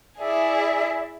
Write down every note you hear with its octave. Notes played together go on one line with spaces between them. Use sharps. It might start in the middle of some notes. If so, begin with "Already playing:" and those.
E4 G#4 D5 E5